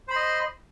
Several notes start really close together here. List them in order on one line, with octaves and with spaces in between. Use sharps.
C5 B5 C6 D#5